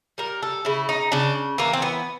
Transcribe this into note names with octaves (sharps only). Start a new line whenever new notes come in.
G3 A#4
A4
C#3 E4
D#4
C#3 D4
E3 A#3
C4
B3